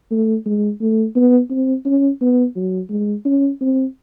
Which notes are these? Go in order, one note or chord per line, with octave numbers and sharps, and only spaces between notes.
A3
G#3
A3
B3
C4
C#4
B3
F#3
G#3
C#4
C4